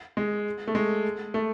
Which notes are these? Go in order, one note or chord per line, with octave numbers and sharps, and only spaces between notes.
G#3
A3
G#3
A3